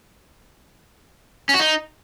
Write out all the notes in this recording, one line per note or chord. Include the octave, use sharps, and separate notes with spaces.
C#4
F#4
D#4